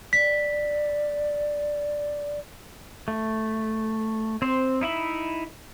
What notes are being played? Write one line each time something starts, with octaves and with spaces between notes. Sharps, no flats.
D5 B6
A3
C4 C5
D#4 E4 E5 B5